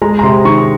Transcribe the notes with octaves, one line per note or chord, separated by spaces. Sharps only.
G#3 A#5
A#5
C3 C6
D#3 C#6